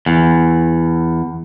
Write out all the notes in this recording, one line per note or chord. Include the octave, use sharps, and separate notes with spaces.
E2